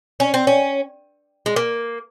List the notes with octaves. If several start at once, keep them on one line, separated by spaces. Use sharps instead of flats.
C#4
C4
C#4
G#3
A#3